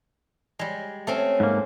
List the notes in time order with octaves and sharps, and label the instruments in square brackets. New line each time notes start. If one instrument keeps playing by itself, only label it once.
[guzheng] G3 G#3
A3 C4 C#4
[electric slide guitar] G#2 A#3